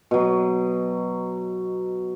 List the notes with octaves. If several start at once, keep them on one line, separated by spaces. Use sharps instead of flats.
B2 F#3